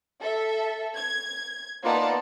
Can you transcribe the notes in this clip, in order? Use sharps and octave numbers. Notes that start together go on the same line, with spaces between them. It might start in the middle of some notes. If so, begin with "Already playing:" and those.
A4 E5
G#6
A#3 B3 D#4 F4 D5 A5